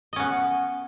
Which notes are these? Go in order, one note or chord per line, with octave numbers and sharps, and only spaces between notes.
B3 C#4 D#5